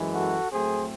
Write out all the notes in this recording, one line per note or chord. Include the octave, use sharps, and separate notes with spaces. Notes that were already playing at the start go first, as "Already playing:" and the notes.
Already playing: F#2 E3 G#3
F#4 A4
A2 F#3 A3 C4 G#4 C5